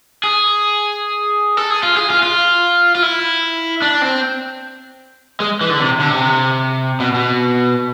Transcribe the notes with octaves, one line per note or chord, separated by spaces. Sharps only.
G#4
A4
G#4
F4
G#4
F4
F4
F4
E4
D4
C4
G#3
E3
D3
C3
D3
C3
B2
B2